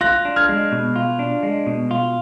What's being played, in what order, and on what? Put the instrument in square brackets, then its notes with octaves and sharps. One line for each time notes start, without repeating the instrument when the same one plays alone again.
[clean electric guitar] F4 [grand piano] F#6 A#6
[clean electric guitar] D4
[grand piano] F6 G#6
[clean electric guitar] G#3
B2
F4
D4
G#3
B2
F4